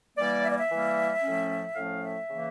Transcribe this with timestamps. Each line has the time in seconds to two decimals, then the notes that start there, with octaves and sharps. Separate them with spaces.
0.18 E3 G3 A#3 D5
0.44 E5
0.51 D5
0.58 E5
0.70 E3 G3 A#3
1.23 A2 F3 A3 C#4
1.76 A2 F3 A3 C#4 F5
2.02 E5
2.29 C#3 E3 A#3